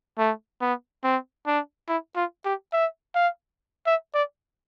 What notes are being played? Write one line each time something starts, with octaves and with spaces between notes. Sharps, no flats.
A3
B3
C4
D4
E4
F4
G4
E5
F5
E5
D5